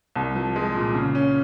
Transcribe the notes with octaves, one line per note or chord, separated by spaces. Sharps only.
C2
F3
G#3
A#2
C#3
C#4